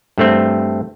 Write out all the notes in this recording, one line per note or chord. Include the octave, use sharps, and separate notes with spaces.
G2 A3 C4